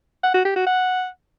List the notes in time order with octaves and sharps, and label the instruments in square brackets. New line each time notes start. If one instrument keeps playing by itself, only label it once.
[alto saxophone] F#5
F#4
G4
F#4
F#5